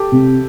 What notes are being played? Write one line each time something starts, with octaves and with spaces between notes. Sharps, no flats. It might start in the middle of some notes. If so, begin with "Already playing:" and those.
Already playing: G4 A4
C3